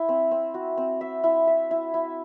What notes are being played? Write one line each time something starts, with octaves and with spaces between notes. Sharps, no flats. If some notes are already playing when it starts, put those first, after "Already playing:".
Already playing: E4
C4
C4
F#4
C4
E5
E4
E5
E4
E4